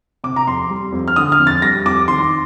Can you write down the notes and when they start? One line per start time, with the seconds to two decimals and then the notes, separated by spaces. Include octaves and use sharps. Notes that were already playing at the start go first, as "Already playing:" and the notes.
0.24 C3 D6
0.36 A#5
0.47 F2 C6
0.70 G3
0.92 F2
1.08 F6
1.16 D3 D#6
1.32 F6
1.39 F2
1.47 A6
1.62 G3 A#6
1.86 F2 D6
2.08 D#3 C6